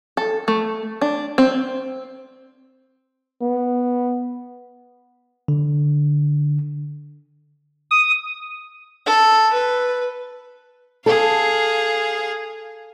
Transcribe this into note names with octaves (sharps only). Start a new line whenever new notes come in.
A4
A3
D4
C4
B3
D3
D#6
A4
B4
G#4 A4 F5